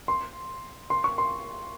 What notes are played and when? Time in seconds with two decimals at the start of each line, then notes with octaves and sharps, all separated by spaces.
0.08 C6
0.90 C6
1.04 C#6
1.18 C6